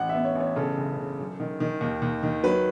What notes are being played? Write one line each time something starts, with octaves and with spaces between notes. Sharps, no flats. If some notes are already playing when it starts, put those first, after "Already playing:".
Already playing: A1 F#5
E5
B3
C#5
A1 C#5
C#3 A4
F#1
F#1
F#2
D#3
D#3
D#2
D#2
D#3
F#3 B4